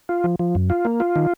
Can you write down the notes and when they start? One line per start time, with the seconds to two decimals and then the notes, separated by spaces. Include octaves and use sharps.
0.09 F4
0.24 F3
0.39 F3
0.55 F#2
0.70 F4
0.85 A#3
1.00 F4
1.16 D#3